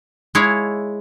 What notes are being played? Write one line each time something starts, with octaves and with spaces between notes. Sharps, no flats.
G#3 E4 C#5 F5